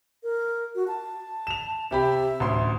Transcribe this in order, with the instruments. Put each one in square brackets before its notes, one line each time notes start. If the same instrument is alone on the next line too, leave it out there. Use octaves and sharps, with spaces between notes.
[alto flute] A#4
F#4
A5
[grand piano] E7 F7
[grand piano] C3 G4 B5 [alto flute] E5
[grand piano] A1 D2 C6